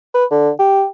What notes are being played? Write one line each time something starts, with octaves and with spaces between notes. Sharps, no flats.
B4
D3
G4